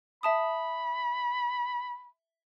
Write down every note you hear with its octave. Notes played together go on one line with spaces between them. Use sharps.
E5 A5 B5 D#6